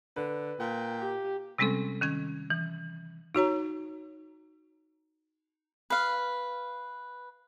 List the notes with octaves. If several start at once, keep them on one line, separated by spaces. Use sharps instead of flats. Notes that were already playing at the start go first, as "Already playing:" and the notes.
D3 B4
A#2 G5
G4
C3 G3 G#3 C4 C#4 A4
D#3 C#4 G#6
E3
D#4 F#4 C#5 A#5
B4 F5